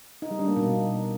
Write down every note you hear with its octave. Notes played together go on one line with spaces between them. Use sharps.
D#4
G3
D4
A#3
B2